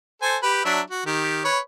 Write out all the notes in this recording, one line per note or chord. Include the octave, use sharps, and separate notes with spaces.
A4 C5 G#5
G4 B4
F#3 D4 E5
F#4
D#3 G4
B4 C#5